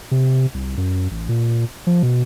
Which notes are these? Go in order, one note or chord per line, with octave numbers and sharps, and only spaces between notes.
C3
C2
F#2
A1
A#2
F3
B2